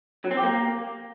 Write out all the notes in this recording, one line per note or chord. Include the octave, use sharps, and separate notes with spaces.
F#3
C4
G4
A#3